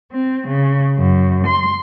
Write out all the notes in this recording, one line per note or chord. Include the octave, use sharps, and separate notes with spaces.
C4
C#3
F#2
C6